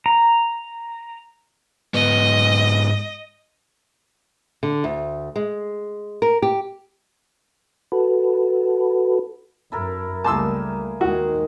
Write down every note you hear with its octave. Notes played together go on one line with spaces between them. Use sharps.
A#5
G#2 B3 D#5
D3
D2
G#3
A#4
G4
F#4 A4 B4
F#2 E4 A4 A#4
C#2 G3 A3 A#3 G#4 A5 C6 E6
D#2 D#3 G#3 F#4